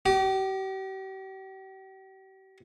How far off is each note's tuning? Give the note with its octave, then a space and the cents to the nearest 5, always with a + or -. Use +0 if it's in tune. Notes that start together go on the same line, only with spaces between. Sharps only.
G4 -40 D6 +20